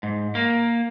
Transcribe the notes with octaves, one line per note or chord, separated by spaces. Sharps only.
G#2
A#3